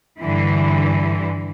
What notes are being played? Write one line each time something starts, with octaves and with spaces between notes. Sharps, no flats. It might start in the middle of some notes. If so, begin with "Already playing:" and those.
G2 D3 E3